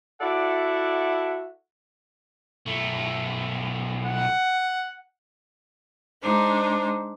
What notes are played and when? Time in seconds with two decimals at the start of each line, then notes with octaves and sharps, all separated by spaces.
0.21 E4 F#4 A4 D5 E5 F#5
2.66 B1 A3
4.06 F#5
6.22 G#3 D4 D#4 C5